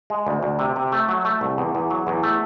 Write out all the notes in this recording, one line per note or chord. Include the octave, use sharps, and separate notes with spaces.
G#3
D2
D2
C3
C3
A3
F#3
A3
C2
E2
E2
F#3
E2
A3